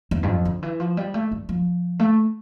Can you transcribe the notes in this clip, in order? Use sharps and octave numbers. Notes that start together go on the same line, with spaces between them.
E2
G2
F2
D3
E3
F3
G3
A3
G3
F3
A3